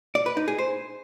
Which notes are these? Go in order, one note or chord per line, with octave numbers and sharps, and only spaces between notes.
D5
B4
D#4
G#4
C5